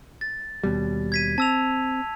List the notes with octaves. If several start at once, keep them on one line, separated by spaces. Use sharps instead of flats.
A6
D#2 B2 G3
G#6 B6 D#7
C4 A5 E6 F7